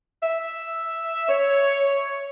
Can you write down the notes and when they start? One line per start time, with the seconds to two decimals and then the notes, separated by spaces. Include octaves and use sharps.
0.22 E5
1.29 C#5